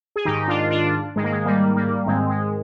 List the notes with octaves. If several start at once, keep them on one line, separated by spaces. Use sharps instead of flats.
G#4
G#2 D#3 D#4 G4
D4 F4
D4 F4
G#2 D#3 G#3
A#3
G#3
G3 A#3
G3 A#3
G#2 D#3 G#3 C4
G#3